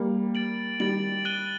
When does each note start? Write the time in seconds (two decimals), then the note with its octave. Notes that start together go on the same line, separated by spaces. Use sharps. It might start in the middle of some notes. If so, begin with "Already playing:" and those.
Already playing: G3 A#3
0.35 A6 D7 F#7
0.80 D#3 G3 A6 D7 F#7
1.25 F#6 A6 D#7 G7